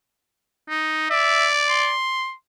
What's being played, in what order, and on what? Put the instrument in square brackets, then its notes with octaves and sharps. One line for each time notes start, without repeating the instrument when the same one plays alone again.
[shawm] D#4
[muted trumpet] D5 [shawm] E5
[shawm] C6